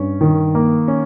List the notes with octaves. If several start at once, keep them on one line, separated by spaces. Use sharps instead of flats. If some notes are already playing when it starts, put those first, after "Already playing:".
Already playing: G2 C#4
D#3
A#3
C#4